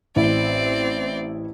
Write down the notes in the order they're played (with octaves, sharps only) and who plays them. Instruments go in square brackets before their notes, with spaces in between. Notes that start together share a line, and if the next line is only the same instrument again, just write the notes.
[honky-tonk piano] A1 E4 [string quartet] C4 D5